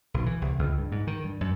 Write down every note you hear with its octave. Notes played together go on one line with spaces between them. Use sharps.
B1
E3
C2
C#2
G2
G#2
D#3
G2
F#2